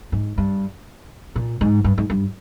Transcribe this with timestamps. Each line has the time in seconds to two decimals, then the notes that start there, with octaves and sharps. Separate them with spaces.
0.12 G#2
0.38 G2
1.36 A#2
1.61 G#2
1.84 G2
1.98 G#2
2.10 G2